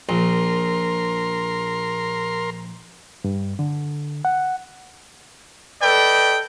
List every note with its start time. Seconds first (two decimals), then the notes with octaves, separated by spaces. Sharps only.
0.09 A#1 A#4 C6
3.24 G2
3.59 D3
4.25 F#5
5.81 A4 B4 D5 D#5 G5